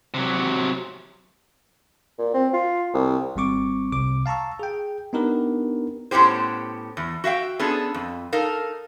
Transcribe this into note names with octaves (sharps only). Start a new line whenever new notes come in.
C3 F#3
A#2
C4
F4
C2
G#1 G3 C4 C#6 D6
C2 C3 D6
F5 A5 A#5 C#6 E6
G#4 G5
B3 D4 D#4 G4 A#4 B4
A2 B3 C#4 G4 C5
E2
F#4 E5 F5 G5
B3 C#4 D4 G#4 A4
F2
D#4 A4 A#4 F5